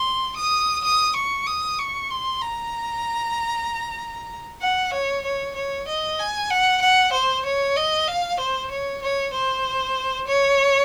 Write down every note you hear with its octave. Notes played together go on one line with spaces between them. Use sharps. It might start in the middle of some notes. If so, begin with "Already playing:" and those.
Already playing: C6
D#6
D#6
C#6
D#6
C#6
C6
A#5
F#5
C#5
C#5
C#5
D#5
G#5
F#5
F#5
C5
C#5
D#5
F5
C5
C#5
C#5
C5
C#5